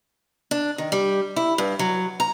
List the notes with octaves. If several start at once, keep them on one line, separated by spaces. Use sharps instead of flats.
D4
D#3
G3
E4
G2
F#3
A#5